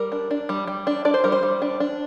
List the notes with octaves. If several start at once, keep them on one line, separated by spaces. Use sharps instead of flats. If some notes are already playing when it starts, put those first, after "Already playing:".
Already playing: G3 A#4
D4
D4
G3
G3
D4
D4 D5
C5
G3 A#4
C5
G3
D4
D4